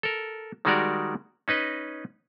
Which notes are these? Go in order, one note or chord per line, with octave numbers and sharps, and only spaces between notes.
A4 A#4
D#3 G3 G#3 F#4 A#4 D5
C#4 D#4 B4 D#5